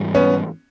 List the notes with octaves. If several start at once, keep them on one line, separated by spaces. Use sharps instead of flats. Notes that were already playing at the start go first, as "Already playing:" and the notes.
Already playing: G#2 E3 G3
B3 C#4